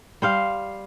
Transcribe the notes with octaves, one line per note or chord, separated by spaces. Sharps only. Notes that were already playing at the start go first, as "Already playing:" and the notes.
G3 C5 F5